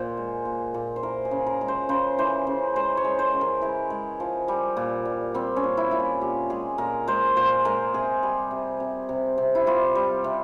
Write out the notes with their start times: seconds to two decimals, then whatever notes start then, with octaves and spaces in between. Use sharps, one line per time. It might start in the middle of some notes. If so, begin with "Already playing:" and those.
Already playing: A#2 C5
0.17 G#3
0.45 A#2
0.74 A#2
0.96 C5
1.03 E3 A#4
1.25 G#4
1.31 C#3
1.46 A#4
1.61 G#3
1.68 C5
1.89 C#3 C5
2.18 E3 C5
2.47 C#3
2.76 G#3 C5
2.97 C#5
3.05 G#3
3.19 C5
3.34 C#3
3.41 A#4
3.61 G#3 E4
3.90 G#3
4.20 F3
4.48 G3
4.77 A#2
5.05 G3
5.34 G3 C4
5.56 C#4
5.64 A#2
5.77 E4
5.91 A#2 E4
6.00 F4
6.21 A#2 G4
6.50 G#3 G#4
6.78 A#2 A#4
7.08 G#3 C5
7.36 A#2 C5
7.65 G#3 A#4
7.93 C3 G#4
8.23 G3
8.51 C3
8.80 C3
9.09 C3
9.38 C3
9.55 E4
9.66 G3 F4
9.95 G3
10.24 C3